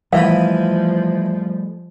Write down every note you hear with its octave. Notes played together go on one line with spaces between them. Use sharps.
E3 F3 G3 A3 D#5 F5 B5